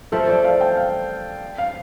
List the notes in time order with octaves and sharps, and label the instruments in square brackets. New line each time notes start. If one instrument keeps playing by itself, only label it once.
[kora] F3 A3 C4 [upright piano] A4
[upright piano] D5
F5
G5
F5
F5